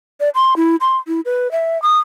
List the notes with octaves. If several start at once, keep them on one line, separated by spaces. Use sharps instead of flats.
D5
C6
E4
C6
E4
B4
E5
D#6